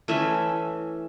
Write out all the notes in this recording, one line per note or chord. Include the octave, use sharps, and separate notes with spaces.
E3 A3 C#4 E5